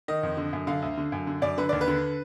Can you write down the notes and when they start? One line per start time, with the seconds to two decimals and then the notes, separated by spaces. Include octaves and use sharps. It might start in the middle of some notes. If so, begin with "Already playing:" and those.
0.08 D#3 D#5
0.23 F2
0.37 D3
0.53 F#2
0.67 D3 F5
0.82 D2
0.98 D3
1.12 F#2
1.27 D3
1.42 F#2 D5
1.58 D3 B4
1.69 D#2 D5
1.81 B4
1.88 D3